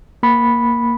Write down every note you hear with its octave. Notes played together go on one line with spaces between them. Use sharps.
A#3 B5